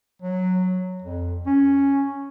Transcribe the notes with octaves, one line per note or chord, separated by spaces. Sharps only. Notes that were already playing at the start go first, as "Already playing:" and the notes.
F#3
F2
C#4